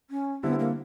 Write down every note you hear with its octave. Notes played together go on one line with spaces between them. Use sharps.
C#4
D3 G3 B3 C4 E4
A#3